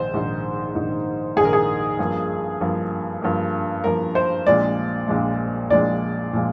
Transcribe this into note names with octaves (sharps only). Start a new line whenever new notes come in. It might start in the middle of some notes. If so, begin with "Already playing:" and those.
Already playing: A#1 G#2 D#3 C5
A#1 G#2 D#3
A#1 G#2 D#3
A#1 G#2 D#3 G#4
A#4
G#4
G2 F3 A#3
G2 F3 A#3
G2 F3 A#3
G2 F3 A#3 A#4
C5
A#1 A#2 F3 G#3 D5
A#1 A#2 F3 G#3
A#1 A#2 F3 G#3 D5
A#2 F3 G#3